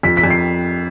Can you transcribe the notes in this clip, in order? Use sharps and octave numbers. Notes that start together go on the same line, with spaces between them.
F2 B6
B6
F2
C7